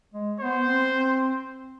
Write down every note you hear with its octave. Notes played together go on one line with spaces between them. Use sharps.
G#3
B3 C5
C4
C4